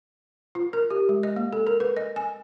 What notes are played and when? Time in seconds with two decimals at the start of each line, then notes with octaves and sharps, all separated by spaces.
0.55 F4
0.73 A#4
0.90 G4
1.09 G#3
1.23 D#5
1.36 A#3
1.53 A4
1.67 A#4
1.80 B4
1.97 D#5
2.16 G#5